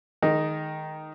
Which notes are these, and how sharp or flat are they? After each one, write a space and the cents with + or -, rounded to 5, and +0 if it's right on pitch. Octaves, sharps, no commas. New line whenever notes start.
D#3 +0 G#3 +30 D#4 +0